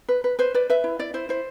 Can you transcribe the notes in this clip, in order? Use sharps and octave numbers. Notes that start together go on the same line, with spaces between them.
B4
B4
B4 C5
B4 D5
B4 E5
E4
E4 D5
E4 C5
E4 C5